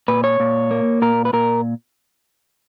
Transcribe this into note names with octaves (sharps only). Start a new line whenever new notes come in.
A#2 B4
C#5
A#2
A#3
A#2 A#4
B4
A#2 A#4